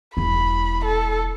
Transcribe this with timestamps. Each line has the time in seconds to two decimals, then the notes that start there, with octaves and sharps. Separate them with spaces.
0.17 E1 E4 B5
0.85 A4